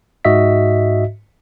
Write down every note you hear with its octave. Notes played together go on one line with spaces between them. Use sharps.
G#2 F#4 D#5 E5 B6